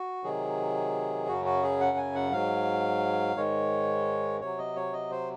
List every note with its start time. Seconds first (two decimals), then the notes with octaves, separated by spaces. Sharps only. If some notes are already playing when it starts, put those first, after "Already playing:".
Already playing: F#4
0.24 C3 D#3 F#3 G#4
1.28 F#2 C#3 F#3 F#4
1.46 F#4
1.63 G#4
1.80 F#5
1.97 G#5
2.15 F#5
2.32 G#2 F#3 F5
3.36 G#2 D#3 G#3 C#5
4.41 C3 F#3 C#5
4.58 D#5
4.76 C#5
4.93 D#5
5.11 C5